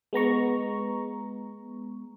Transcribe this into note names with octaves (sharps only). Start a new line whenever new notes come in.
G#3 B3 A#5 C#6